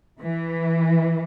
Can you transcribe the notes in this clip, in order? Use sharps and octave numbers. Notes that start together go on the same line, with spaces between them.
E3